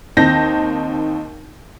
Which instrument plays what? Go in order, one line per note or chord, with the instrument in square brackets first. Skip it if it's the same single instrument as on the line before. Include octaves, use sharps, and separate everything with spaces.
[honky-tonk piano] D#2 C4 D#4 A5 G6 A#6